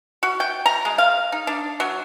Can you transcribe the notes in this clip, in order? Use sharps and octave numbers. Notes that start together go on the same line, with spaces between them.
F#4
G5
A#5
G#3
F5
D#4
D4
F#3